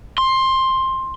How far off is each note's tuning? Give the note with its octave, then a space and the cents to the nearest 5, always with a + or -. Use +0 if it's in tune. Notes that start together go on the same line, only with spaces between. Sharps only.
C6 +15